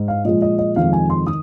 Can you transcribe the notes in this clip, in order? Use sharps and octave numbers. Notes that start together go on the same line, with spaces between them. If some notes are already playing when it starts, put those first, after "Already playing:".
Already playing: G#2
F5
A#2 F3 G#3 D#5
D#5
D#5
F2 C3 D#3 G#3 F5
G#5
C6
D#3 D#6